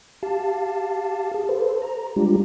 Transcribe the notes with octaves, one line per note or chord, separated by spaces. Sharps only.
G4 F5 A5
G#4
A4 B4 C5
A#5
G3 G#3 D4 F4 G4